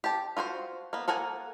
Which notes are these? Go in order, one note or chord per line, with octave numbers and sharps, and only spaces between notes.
G4 A5
F4 F#4 G#4 C5
A#3 B3
A#3 A4 A#4 F#5 G#5